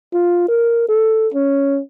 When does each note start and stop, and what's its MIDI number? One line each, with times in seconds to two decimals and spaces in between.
0.13 0.48 65
0.48 0.84 70
0.89 1.28 69
1.34 1.80 61